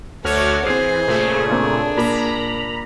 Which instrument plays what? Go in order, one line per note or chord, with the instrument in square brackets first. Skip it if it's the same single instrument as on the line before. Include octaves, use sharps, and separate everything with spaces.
[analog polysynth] D2 F#4 F6 [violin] A3 [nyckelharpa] C#5 D6
[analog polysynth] E3 [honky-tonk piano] C4 C7 [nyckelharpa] G#4 [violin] C5
[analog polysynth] A#2 C#3 A3
[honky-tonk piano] A#3 C4 [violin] D4
[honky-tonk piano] A#2 [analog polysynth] A#5 B5